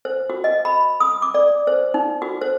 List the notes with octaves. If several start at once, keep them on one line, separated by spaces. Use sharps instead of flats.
C5
F#4
D#5
B5
D#6
D6
D5
C5
D#4
F#4
C5